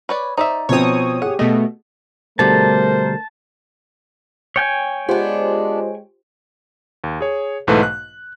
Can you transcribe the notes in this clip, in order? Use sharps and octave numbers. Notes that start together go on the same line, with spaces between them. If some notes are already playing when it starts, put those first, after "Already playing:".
B4 C#5 D5
D#4 C5 D5 E5
B2 F3 C4 C#5 D#6
G4 G#4 F#5
B2 A3 D#5
B2 D3 G3 A3 A#4 C5 A5
C#5 G5 G#5
G#3 B3 D4 F4 G4 C5
D#2
G#4 C#5
B1 G#2 E3 A3 B4
F#6